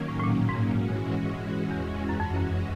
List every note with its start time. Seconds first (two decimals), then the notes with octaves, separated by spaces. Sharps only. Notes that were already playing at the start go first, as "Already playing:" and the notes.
Already playing: D#3 F#3 A#3 C#4
0.09 A2
0.20 A2
0.24 A#2
0.49 G#2
0.73 E3 G#3 C#4 F#4
1.71 E2
2.09 F#2
2.20 F2
2.36 F#2